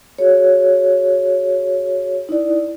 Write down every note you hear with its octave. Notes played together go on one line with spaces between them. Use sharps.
F#4 G#4 C#5
D#4 E4 D5